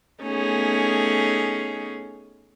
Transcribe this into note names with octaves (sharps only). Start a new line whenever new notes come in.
A3 B3 C#4 D#4 G#4